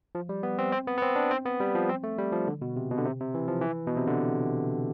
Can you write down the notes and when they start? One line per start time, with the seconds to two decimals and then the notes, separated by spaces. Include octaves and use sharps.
0.15 F3
0.29 G3
0.43 B3
0.58 C4
0.72 C4
0.87 B3
0.98 B3
1.02 C4
1.16 D4
1.31 C4
1.45 B3
1.60 G3
1.75 F3
1.89 C4
2.04 A3
2.18 G3
2.32 F3
2.47 D3
2.62 B2
2.76 C3
2.91 B2
2.98 D3
3.05 C3
3.20 C3
3.34 E3
3.48 F3
3.61 E3
3.87 B2
3.97 C3
4.07 D3